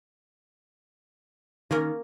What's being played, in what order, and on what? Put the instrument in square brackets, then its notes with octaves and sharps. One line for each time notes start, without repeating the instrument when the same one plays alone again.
[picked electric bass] D#3 [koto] A#3 C#4 A#4